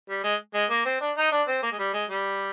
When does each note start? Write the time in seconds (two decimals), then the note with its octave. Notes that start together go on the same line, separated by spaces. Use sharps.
0.09 G3
0.24 G#3
0.54 G#3
0.70 A#3
0.85 C4
1.01 D4
1.17 D#4
1.32 D4
1.48 C4
1.63 A#3
1.72 G#3
1.79 G3
1.94 G#3
2.10 G3